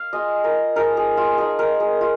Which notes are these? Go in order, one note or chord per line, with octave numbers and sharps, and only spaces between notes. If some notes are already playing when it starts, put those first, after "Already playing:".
Already playing: F5
G#3 F4 D#5
A#4
F3 G#3 D#4 A#4
G#4
F4
F3 G#3 D#4 G#4
A#4
G#4
F4